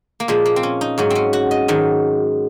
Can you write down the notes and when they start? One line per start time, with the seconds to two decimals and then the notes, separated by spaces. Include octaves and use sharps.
0.20 A#3
0.28 A#2 F3 G#3
0.46 A#3
0.56 C4
0.63 C#4
0.81 D#4
0.98 G#2 F#3 C#4
1.10 C4 C#4
1.33 F#4
1.51 D#5
1.68 G#2 D#3 F#3